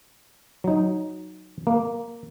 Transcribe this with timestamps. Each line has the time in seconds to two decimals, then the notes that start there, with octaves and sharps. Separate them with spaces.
0.64 F#3 D#4
1.67 A#3